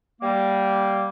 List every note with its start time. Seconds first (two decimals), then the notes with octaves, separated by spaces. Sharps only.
0.21 G3 A#3